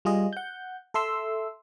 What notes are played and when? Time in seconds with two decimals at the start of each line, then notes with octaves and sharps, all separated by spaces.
0.05 G3 F4 G#4 D#5
0.33 F#5 G6
0.94 A4 E5 C6 E6